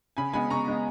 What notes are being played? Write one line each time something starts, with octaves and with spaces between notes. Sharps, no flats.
C#3 G#5 B5
G#3 B3 G#5 B5
C#3 A#5 C#6
G#3 B3